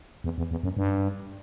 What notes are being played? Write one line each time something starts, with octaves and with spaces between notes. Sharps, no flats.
E2
E2
E2
F#2
G2